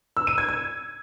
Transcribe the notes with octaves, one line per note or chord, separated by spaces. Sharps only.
E6
D#7
G#6
G#6